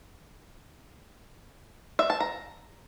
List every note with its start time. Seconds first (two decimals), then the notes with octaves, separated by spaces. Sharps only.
1.99 E5
2.10 A5
2.20 A#5